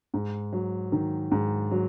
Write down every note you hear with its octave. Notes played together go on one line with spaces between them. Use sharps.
G#2
F#3
D#3
G#2
F#3